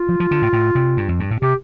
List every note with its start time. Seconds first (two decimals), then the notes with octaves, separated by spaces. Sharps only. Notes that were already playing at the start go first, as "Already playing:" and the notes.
Already playing: F4
0.09 F3
0.20 F3
0.31 D3
0.42 A2
0.53 A2
0.75 C3
0.97 G2
1.09 F2
1.20 G2
1.31 A2
1.41 C3 G4